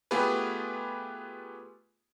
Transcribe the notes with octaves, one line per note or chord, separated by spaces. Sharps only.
A3 B3 F4 G4 G#4 B4